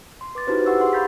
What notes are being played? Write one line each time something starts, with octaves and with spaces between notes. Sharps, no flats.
C6
B4 D6 A6
D#4 E4 F#4 G4 B4 C5
G4 F#5 C#6 E6
G#4 F#5 C6
F5 B5 G6 A6 B6